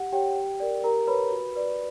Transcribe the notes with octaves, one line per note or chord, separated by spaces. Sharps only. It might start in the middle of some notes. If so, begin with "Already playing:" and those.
Already playing: G4 F#5
G4 C#5 G5
G4
A#4 D5
G4 A#4 A#5
B4 C#5 B5
F#4
B4 D5